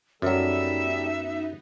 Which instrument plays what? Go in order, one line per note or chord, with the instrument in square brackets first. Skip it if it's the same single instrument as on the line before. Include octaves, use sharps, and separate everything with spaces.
[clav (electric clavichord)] F#2 F#3 [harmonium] G3 A4 [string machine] B3 D#4 [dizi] E5